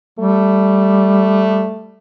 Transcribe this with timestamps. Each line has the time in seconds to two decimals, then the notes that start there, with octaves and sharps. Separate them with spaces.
0.19 G3 A3